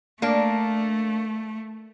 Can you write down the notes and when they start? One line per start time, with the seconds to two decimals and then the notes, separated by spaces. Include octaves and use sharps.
0.22 A3 A#3 D4